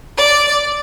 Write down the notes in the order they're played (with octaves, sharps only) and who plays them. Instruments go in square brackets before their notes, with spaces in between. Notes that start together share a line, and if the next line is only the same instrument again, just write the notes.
[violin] D5